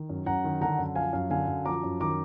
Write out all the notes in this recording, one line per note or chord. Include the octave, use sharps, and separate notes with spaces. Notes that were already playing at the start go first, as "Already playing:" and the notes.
Already playing: D#3
F#2
F#2 F#5 A#5
D#3
D3 F#5 A#5
F#2
F3 F5 G#5
F#2 F5
D3 F5 G#5
F#2
F3 A#5 D6
F#2
D#3 A#5 D6